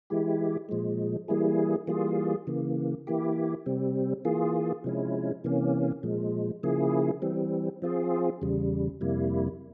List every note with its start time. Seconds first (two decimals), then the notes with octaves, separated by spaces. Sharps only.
0.10 E3 G#3 E4 G4
0.69 A#2 F3 G#3
1.28 E3 G3 A#3 E4 G#4
1.87 E3 G3 A#3 F4 G#4
2.47 C#3 E3 A#3
3.07 E3 A#3 E4 G4
3.66 C3 G3 C4
4.25 E3 A#3 F4 G#4
4.84 C3 F3 G#3 C#4 E4
5.44 C3 E3 A#3 C#4
6.03 A#2 F3 G#3
6.63 C#3 F3 A#3 E4 G#4
7.22 E3 G3 C4
7.82 F3 C4 F4 G#4
8.42 E2 C#3 G3
9.01 F2 C3 G3 A#3 E4